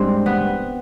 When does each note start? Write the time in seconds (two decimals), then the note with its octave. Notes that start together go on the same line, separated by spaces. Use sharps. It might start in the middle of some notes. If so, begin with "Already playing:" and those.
Already playing: G#2 G3 C4 D4
0.26 B3